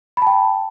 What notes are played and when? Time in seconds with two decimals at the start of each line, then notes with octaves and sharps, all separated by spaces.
0.17 B5
0.22 A5
0.27 G5